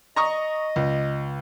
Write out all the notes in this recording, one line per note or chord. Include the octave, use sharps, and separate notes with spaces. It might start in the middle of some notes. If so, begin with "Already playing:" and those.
D#5 A#5 C#6 D#6
C#2